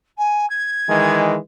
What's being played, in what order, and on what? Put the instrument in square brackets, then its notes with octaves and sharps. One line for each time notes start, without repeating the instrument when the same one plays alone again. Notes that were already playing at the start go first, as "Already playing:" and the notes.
[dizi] G#5
G#6
[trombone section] D#3 E3 G#3